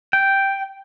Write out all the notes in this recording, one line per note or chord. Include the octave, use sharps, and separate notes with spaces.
G5